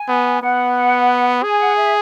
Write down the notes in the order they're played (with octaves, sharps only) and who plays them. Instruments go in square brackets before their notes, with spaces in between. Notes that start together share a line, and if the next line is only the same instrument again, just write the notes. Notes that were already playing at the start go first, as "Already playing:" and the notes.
Already playing: [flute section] G#5
[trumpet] B3
[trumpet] B3 [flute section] F#5
[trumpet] G#4 [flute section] G#5
[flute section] F#5
E5